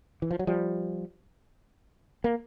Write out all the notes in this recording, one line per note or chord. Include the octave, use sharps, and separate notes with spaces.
E3
F3
F#3
F3 G3
A#3